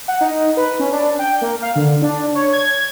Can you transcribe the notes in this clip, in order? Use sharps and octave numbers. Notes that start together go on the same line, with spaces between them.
F#5
D#4
B4
C#4
D4
G5
A#3
F5
D3
D4
C#5
G#6